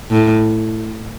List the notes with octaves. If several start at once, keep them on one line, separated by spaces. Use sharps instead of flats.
A2